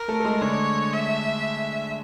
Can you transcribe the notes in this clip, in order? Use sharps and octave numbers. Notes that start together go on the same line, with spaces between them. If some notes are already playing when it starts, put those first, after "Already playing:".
Already playing: A#4
A3 A4
A4
G#3 G#4
D3 D4 C#5
E5